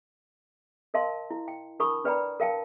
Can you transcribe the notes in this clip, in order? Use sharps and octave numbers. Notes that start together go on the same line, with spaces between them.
A#4 D#5 F5 A5 C6
E4
G5
D4 A#4 A5 B5 C#6 D#6
D4 B4 D5 G5 A#5 B5
A#4 F5 G5 A5